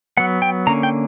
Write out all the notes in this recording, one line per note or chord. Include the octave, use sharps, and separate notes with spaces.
F#3 B3 F#5
G5
D3 A#3 C#4 A#5
G5